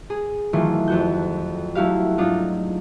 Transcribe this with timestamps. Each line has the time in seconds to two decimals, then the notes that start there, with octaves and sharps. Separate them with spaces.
0.10 G#4
0.53 D#3 E3 F#3 A3 F4
0.88 F2 F#4 G6
1.75 F#3 A3 E4 F#4 G4 F5
2.18 G#2 F#3 D4 D#4 F4 F#4